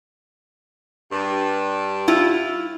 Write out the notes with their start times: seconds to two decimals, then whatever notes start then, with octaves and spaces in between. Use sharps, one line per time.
1.11 G2
2.08 E4 F4